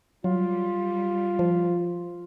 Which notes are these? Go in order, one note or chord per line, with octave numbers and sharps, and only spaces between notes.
F#3 G3 F4
F3